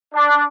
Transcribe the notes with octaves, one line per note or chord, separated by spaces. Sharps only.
D4